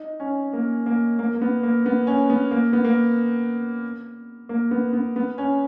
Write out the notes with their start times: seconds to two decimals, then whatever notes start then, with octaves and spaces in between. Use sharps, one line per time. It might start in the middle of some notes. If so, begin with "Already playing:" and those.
Already playing: D#4
0.20 C#4
0.53 A#3
0.86 A#3
1.19 A#3
1.34 A#3
1.41 B3
1.63 A#3
1.86 B3
2.07 C#4
2.30 B3
2.51 A#3
2.73 B3
2.84 A#3
4.49 A#3
4.71 B3
4.93 B3
5.16 B3
5.38 C#4